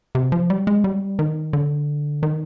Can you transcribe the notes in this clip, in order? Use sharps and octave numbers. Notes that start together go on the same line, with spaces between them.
C3
F3
G3
G#3
G3
D#3
D3
D#3